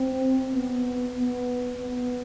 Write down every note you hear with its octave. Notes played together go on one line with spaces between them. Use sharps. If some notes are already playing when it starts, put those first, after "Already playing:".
Already playing: C4
B3
B3
B3